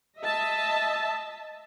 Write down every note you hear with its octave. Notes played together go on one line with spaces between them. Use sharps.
D#5 E5 A5